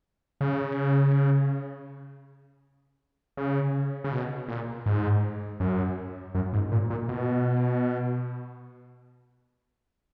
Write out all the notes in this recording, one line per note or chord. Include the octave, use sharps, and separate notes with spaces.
C#3
C#3
C#3
B2
A#2
G#2
F#2
F#2
G#2
A#2
A#2
B2